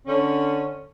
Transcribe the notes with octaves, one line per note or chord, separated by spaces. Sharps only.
D3 C#4